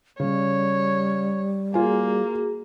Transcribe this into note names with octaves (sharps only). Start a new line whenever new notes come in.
C#3 G3 C#5
A#3 F4 F#4 G#4 G#5